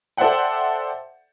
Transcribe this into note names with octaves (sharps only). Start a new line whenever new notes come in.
A4 C5 D5 E5 F#5 G5